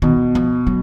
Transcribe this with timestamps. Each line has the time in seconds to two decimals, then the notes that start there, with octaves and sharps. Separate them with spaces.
0.02 B2 D#3
0.35 F3
0.67 F#3